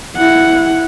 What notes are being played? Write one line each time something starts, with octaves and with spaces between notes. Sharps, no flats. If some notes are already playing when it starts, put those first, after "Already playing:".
E4 F#5